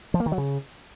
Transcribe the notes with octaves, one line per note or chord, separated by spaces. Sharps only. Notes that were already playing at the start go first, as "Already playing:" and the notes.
F3
A#3
D#3
F#3
C#3